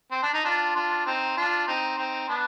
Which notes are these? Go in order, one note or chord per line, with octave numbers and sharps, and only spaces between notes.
C4
D4
D#4
D4 F4
D4 F4
C4 D#4
D4 F4
C4 D#4
C4 D#4
B3 D4